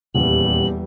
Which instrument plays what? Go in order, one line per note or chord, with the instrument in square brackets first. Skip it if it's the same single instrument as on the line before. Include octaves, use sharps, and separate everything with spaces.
[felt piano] D#1 [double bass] E2 G3 [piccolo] F#7